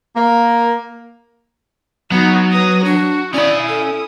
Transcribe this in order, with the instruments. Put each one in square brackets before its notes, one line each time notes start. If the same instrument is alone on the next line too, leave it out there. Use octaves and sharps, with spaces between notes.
[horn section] A#3
[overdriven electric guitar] F#3 [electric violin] B3 D#4 [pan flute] F#4
[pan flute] B4 [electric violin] D#6 A#6
[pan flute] D4 [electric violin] F#4
[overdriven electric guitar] C#4 B5 [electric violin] E4 D#6 [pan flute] D5
[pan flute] A4